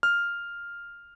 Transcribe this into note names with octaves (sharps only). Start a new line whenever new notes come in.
F6